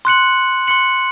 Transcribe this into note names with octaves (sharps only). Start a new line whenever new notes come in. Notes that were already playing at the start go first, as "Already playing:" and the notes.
C6 F#6 C#7 F#7
C6 F#6 C#7 F#7